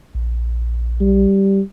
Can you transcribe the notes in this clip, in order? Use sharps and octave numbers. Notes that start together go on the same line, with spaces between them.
A#1
G3